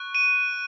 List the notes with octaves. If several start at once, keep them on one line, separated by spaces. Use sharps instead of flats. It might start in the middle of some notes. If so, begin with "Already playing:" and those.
Already playing: C#6 F#6
D#7